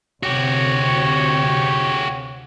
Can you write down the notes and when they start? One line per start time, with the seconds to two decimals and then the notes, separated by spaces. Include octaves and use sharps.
0.23 D2 C3 F#4 G4 C#5